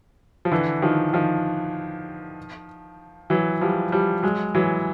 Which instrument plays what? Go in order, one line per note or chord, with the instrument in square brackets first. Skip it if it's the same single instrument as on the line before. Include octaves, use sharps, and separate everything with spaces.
[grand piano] F3
D3 E3
D#3 F3
D#3 F3
E3 F#3
F3 G3
F3 G3
F#3 G#3
E3 F#3